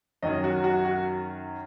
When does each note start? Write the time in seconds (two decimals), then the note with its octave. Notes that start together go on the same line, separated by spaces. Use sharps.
0.23 F#2 D#3 F#3 D#5
0.44 F#4
0.64 F#4
0.85 F#4